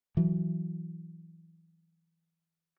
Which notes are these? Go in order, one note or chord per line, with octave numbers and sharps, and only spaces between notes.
E3 F#3